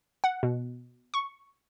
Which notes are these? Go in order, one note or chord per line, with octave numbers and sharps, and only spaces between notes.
F#5
B2
C#6